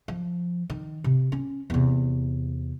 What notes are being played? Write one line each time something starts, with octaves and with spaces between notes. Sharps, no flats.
F3
D#3
C3
C#4
E2 C3